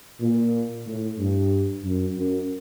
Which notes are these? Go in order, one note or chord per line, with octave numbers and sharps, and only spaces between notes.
A#2
A2
G2
F#2
F#2